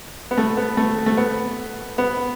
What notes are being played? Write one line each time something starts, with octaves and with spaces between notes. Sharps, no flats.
B3
A3
B3
A3
A3
B3
B3